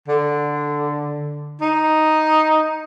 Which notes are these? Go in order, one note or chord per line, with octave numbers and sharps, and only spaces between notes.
D3
D#4